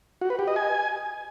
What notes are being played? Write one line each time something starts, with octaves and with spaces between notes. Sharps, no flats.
F#4
B4
G4
D#5
G#5